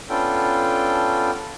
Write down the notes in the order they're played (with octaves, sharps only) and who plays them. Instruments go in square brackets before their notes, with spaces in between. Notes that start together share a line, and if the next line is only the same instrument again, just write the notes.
[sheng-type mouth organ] B3 C#4 D4 F4 A4 G5